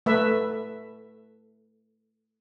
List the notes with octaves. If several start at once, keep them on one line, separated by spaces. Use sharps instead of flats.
A3 B4 E5